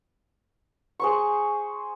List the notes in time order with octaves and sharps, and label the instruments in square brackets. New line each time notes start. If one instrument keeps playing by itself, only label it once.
[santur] G#4 C5 C#6